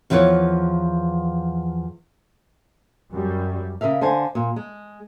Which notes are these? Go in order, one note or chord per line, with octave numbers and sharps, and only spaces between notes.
E2 F3 E4 B4 C#5
F#2 G3
C#3 A#4 E5 F5
D3 C5 F5 G#5
A#2
G#3